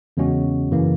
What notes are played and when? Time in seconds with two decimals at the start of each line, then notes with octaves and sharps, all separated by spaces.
0.17 E2 C#3 G#3 C#4 F#4
0.71 F#2 C#3 E3 A#3